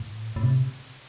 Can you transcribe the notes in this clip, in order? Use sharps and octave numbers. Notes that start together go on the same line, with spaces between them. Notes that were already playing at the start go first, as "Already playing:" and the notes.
Already playing: A2
A2
C3